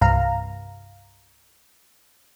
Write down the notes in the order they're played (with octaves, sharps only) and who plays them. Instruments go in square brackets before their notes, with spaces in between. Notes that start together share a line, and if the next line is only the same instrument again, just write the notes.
[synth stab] C2 G2 F5 A#5